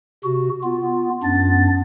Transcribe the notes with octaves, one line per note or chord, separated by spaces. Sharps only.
C3 F#4
B3 F4
F#2 B3 D4 A6